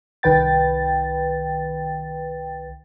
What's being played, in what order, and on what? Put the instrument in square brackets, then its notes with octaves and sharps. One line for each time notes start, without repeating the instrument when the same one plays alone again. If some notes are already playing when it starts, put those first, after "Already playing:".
[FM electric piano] C2 D#3 B4 G5 A6